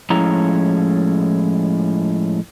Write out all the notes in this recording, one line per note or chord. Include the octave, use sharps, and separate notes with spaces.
A2 F3 G#3 C#4 E4 A#5